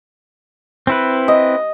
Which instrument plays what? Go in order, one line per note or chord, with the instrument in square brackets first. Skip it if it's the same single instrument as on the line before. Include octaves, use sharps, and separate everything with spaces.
[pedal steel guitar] C4 E4 B4
[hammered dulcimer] D#5